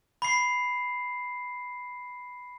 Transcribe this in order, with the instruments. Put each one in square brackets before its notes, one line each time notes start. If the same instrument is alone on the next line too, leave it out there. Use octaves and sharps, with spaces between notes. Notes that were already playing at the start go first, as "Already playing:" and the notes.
[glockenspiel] B5 C7